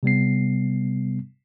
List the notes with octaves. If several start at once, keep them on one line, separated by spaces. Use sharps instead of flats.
C3 G3 B3 C7